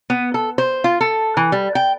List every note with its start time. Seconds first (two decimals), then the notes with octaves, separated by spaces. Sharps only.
0.10 B3
0.34 A4
0.58 C5
0.84 F4
1.01 A4
1.37 E3
1.52 G3
1.75 G5